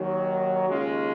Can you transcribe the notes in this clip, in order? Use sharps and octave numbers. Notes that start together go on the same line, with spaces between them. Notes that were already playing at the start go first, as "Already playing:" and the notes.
Already playing: D#2 D#3 F#3
D#2 C#3 G#3 C#4 F4